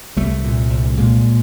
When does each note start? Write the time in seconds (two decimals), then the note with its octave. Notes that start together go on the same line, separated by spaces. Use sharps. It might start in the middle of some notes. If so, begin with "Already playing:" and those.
0.17 C2 G3 A3
0.44 A#2
0.70 C2
0.97 A#2 G#3 A#3